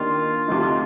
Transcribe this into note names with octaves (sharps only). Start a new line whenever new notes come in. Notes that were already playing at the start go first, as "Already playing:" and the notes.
Already playing: D#2 D#3 A#3 D4 F4
D2 C3 F3 A3 D#4